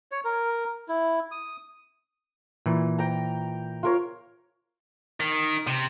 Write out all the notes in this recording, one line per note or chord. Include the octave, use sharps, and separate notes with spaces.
C#5
A#4
E4
D#6
A#2 E3
G5 A#5
F4 A#4 C#5
D#3
C3